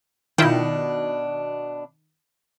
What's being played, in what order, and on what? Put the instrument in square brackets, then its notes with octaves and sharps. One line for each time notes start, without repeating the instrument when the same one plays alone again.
[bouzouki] B2 D4 [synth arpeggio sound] D#3 [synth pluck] E4 F4 G5